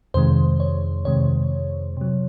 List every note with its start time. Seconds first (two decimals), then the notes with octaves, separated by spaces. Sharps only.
0.14 F2 C3 D#3 G#3 C5
0.60 C#5
1.05 F2 C3 D#3 G#3 C#5
1.97 C3 F#3